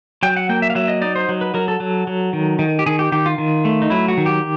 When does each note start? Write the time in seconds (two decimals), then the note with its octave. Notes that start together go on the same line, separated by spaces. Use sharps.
0.23 F#3 G5
0.36 F#5
0.49 A#3 G5
0.62 E5
0.70 F5
0.75 F#3 E5
0.88 D#5
1.02 D#4 D5
1.16 C5
1.29 F#3
1.41 B4
1.54 F#3 A#4
1.68 A4
1.80 F#3
2.07 F#3
2.33 D#3
2.59 D#3
2.79 G4
2.86 D#3 G#4
2.99 G4
3.12 D#3 G4
3.26 F4
3.38 D#3
3.65 A3
3.82 D#4
3.90 F#3 E4
4.08 F#4
4.17 D#3
4.26 G4